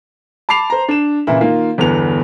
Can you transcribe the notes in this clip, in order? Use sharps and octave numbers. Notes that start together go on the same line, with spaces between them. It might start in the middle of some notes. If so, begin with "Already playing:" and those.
A5 B5 D6 C7 F7
C5 A#5
D4 E7
A#2 C#3 E3 E4
D#3 A#3 F4
G1 E2 B3 F7